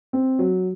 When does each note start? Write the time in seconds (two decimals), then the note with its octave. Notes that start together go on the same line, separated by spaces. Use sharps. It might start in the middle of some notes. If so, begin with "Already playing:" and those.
0.13 C4
0.39 F#3